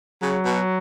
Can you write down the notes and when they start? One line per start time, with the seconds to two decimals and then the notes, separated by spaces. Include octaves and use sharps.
0.22 C#3 F#3
0.45 B2